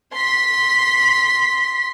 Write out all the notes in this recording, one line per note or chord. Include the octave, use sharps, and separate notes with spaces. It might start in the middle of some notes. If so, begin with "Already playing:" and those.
C6 B6